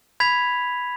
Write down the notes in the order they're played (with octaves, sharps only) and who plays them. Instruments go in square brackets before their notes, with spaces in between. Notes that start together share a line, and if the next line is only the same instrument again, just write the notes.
[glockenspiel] B5 G#6 B6 F7